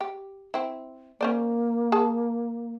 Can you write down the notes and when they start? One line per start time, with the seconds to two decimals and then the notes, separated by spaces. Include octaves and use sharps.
0.01 G4
0.54 C4 E4
1.21 A#3 C#4 C5 D5
1.92 G#4 A5